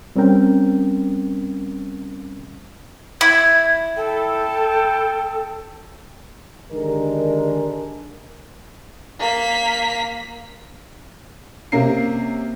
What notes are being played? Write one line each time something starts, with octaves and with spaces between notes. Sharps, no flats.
G3 C4 C#4 A#4 G5
E4 G#6
A4 G5
D3 D#3 G#3 D4 G4 A#4
A#3 B6
C3 A#3 C#4 A#4 C7